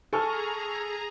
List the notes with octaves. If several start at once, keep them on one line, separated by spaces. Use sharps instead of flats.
G#4 A4 G#5 A#5 C#6 F6